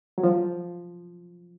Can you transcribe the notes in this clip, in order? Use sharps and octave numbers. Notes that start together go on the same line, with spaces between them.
F#3
F3